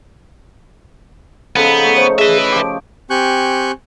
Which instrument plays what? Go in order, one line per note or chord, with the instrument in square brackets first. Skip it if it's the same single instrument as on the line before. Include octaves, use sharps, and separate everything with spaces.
[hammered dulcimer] C#3 F3 D#4 [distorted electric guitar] B3 [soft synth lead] A4
[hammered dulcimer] A3
[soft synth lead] C5 [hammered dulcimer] C#5 D#5
[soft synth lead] G#4 [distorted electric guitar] B4 E5
[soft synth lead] D7
[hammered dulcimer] F3 G4
[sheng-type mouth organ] C4 G4 G#5 C#6 F#6 G6